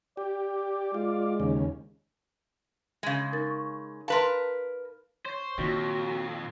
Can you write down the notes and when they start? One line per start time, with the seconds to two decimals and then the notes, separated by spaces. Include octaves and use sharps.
0.17 G4 D5
0.94 G#3 F4
1.40 D#2 C#3
3.03 C#3 G#3
3.32 D#4 A#4 A6
3.47 C#6
4.08 A#4 B4 F5 A5 C6
5.25 C5 C#5
5.58 F2 A#2 D#3 D#4 F#4